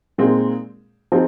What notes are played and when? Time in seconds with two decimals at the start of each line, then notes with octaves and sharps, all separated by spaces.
0.18 A#2 G#3 C4 D#4 G#4
1.12 F3 C4 D#4 G#4 C5